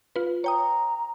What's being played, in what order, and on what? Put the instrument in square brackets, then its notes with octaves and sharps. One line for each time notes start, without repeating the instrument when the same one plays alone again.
[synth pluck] F4 B4
[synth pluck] C#5 G5 D#6 [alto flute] A#5